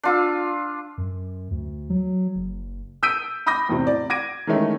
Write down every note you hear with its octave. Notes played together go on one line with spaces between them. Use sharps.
D4 F4 E6
F#2
D2
F#3
F#1
D#6 E6 G6 B6 D7 D#7
B5 D6 D#6 G6 A#6
E2 A2 C3
D5
D6 G#6 A#6 D7 D#7
D#3 E3 G#3 A3 C#4